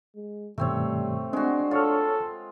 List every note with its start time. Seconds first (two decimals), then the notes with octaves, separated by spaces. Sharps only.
0.16 G#3
0.58 G2 B2 D#3 G3 A3 C4 C#5
1.33 G#3 C4 D4 F#4
1.71 F4 A4 C#5 C#6 F6